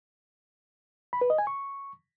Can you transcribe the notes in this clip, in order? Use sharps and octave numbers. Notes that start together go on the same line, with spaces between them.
B5
B4
D#5
G#5
C#6